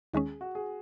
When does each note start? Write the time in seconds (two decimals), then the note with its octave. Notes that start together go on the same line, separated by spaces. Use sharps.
0.14 D#2 D#3 G#3 C#4 G#4
0.41 F#4
0.55 G#4